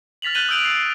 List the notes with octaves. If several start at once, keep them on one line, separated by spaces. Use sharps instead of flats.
F6 A6 B6 F7 F#7
F#6 G6 A6 D#7 F#7 G7
D#6 E6 G6 D7 D#7 F7
C7